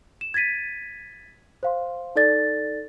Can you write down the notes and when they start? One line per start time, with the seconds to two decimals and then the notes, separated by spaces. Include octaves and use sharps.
0.21 E7
0.34 G#6 A6 B6 D#7
1.63 C5 F5 C6
2.16 D#4 A4 D5 A6